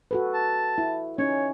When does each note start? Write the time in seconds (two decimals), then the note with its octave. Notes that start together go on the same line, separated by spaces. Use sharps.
0.11 F#4 A4 B4
0.33 A5
0.78 E4
1.18 C#4 D#4 C#5